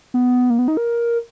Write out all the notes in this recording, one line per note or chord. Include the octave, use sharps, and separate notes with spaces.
B3
A#3
B3
D#4
A#4